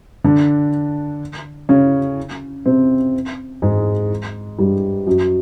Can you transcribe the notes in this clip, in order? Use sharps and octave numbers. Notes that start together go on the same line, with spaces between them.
D3 D4
C#3 C#4
C3 C4
G#2 G#3
G2 G3
F#2 F#3